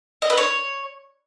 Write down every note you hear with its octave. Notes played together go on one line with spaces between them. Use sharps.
D#5
B4
C#5